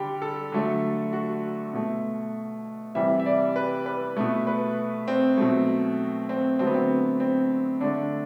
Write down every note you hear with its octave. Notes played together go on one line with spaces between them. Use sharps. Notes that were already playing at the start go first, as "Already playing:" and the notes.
Already playing: D3 G3 G4
A4
D3 F#3 A3
F#4
B2 A3
C3 E3 G3 E5
E5
D5
B4
B4
B2 A3
B4
C4
B2 F#3 A3
C4
D3 F#3 A3 C4
B3
C4
C4
D3 A3 D4